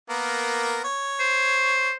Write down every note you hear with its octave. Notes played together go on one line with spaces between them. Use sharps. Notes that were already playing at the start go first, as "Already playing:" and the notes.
A#3 B3 A#4
C#5
C5